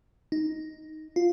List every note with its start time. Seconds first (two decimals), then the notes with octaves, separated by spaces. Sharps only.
0.32 D#4
1.16 F4